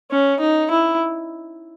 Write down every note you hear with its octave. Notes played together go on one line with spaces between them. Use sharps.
C#4
D#4
E4